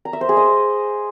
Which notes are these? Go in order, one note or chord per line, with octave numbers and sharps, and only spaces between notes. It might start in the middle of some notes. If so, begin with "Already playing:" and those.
A#5
E5
C5
G#4
D#5